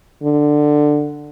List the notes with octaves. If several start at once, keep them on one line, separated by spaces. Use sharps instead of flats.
D3